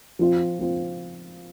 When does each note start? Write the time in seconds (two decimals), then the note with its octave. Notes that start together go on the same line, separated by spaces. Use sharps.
0.19 F3 C4 F4
0.59 F3 C4 F4